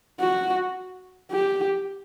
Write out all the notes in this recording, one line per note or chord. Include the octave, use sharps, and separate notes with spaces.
F#4
G4